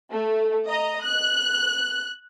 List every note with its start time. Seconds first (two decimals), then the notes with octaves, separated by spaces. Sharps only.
0.12 A3
0.68 D#5 A#5
1.02 F#6